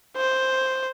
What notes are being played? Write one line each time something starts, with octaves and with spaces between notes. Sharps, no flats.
C5